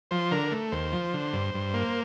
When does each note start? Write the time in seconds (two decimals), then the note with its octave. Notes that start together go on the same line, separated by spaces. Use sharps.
0.11 F3 C5
0.31 D3 A#4
0.52 A3
0.72 D#2 C5
0.93 F3
1.13 D3
1.33 G2
1.54 G2
1.74 A#3